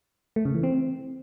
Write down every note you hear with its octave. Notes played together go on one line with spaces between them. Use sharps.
A3
C#3
E3
C4